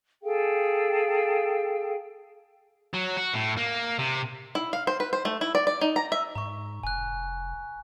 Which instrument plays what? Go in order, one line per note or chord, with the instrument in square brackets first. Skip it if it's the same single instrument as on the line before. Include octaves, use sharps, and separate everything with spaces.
[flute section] G#4 A4 F5 G5
[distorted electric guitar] F#3
F#4
A2
A#3
C3
[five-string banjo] E4
F5
C5
B4
C5
A3
E4
D5
D5
D#4
A#5
E5
[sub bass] G#2 [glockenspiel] A#5 C#6
[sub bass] F1 [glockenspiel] G#5 F#6